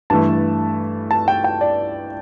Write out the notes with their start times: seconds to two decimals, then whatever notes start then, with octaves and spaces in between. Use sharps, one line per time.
0.10 G2 E3 A3 A5
1.11 A5
1.28 G5
1.44 G5
1.61 D5